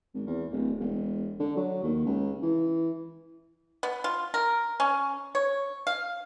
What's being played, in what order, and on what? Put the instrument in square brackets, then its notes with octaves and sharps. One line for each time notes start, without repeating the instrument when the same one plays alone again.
[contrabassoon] G#1
E2
D1
E1
D3
F#3
D#2
C#2
E3
[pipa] B3
F4
A#4
C#4
C#5
F5